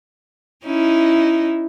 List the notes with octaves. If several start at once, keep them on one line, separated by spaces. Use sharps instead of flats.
C#4 D#4 E4